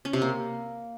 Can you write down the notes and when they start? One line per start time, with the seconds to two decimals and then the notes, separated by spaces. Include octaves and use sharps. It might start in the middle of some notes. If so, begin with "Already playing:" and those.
0.05 C#4
0.13 C3
0.22 A#3